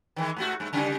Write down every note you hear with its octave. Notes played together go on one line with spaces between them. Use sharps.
D#3 E3 G#3
G#2 A3 F#4
G2 A3
C#3 G3 D#4